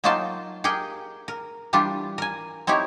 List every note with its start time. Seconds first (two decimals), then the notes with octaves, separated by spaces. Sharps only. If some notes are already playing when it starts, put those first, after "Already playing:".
0.04 F#3 A#3 D#4 F4 G5 A5
0.64 G4 G#4 A#4 G5
1.28 A#4
1.73 E3 G3 D4 F4 G4
2.18 A#4 G#5
2.67 C4 D#4 E4 G4 C#5